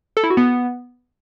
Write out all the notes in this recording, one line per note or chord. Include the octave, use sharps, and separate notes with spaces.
A4
E4
F#4
B3